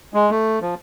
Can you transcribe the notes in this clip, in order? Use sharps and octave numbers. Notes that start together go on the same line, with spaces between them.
G#3
A3
F3